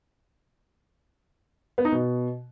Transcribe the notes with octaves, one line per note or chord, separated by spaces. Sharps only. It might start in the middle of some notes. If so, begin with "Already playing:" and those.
B3
D#4
B2